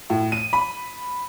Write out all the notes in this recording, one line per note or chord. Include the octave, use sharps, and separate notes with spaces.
A2
D#7
B5